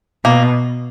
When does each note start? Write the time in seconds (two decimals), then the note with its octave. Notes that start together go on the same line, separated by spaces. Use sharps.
0.25 B2 A#3